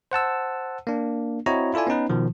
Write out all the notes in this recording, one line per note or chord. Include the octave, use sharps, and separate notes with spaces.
C5 F#5 A5 E6
A#3 D4
C4 E4 F#4 C#5 D#5 A#5
E4 F4 A4 D5 G#5
B3 C#4 D#4 B4
B2 D#3 F3